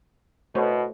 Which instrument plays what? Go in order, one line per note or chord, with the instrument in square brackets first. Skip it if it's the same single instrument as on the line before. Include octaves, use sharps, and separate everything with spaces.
[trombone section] B2 [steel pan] A3 C5 C#5